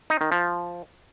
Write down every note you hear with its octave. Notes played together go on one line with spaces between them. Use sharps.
D#4
D#3
F3